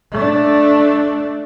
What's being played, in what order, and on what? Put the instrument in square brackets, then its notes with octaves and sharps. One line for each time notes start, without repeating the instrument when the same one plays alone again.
[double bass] A3 D4